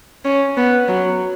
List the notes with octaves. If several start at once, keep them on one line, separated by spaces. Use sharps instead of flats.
C#4
B3
F#3